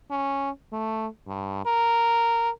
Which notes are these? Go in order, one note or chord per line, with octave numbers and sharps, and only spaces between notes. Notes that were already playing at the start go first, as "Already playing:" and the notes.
C#4
A3
G2
A#4